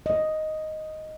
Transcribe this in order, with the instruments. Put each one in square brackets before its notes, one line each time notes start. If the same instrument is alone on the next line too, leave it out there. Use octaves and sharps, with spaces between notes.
[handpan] D#5